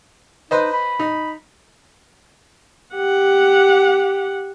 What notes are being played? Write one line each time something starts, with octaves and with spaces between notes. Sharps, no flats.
D#4 B4 C5 D#5
B5
D#4
G4 F#5